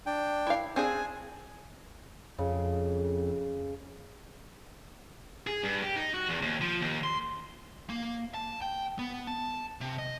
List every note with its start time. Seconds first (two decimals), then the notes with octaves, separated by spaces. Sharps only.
0.06 D4 G5
0.47 E4 F5
0.76 C4 D4 G#4 G#5
2.38 F2 C#3
5.47 G#4
5.63 G2
5.83 G4
5.96 D#4
6.14 F#4
6.29 E2
6.42 D#2
6.61 F3
6.82 D#2
7.04 C6
7.90 A#3
8.34 A5
8.62 G5
8.99 B3
9.27 A5
9.81 C3
9.99 D#5